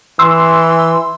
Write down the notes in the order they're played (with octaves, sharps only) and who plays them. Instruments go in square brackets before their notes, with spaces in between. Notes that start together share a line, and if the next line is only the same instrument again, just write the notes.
[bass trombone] E3 [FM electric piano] C6 E6